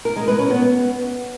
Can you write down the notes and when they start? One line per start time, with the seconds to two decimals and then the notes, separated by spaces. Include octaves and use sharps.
0.05 A#4
0.16 G#3
0.28 B4
0.39 C#4
0.50 B3